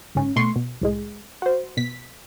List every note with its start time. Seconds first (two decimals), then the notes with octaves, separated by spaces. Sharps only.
0.15 G1 G#2 C#4
0.36 B2 A3 C6 C#6
0.56 B2
0.81 C2 A2 G#3
1.42 F#4 C5
1.77 B2 B6